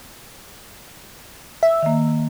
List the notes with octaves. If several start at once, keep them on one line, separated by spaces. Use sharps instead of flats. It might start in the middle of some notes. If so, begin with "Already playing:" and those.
E5
D#3 A#3